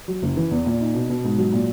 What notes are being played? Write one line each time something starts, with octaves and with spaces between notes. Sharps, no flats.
F#3
F#1
E3
E2
A#2
D#4
B2
B2
G#2
F#3
A#2